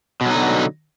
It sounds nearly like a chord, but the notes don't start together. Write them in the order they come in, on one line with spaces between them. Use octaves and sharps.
B2 F#3 D#4 D3